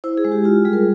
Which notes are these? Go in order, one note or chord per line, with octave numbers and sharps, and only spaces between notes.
E4 C5
G#4
G#3
G4
F4 G4
G3 G#4
A#4